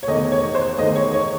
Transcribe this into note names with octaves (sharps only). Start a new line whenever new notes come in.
C#5
E2 D#3 A3 D#5
C#5
C5
E2 D#3 A3 D#5
C#5
C#5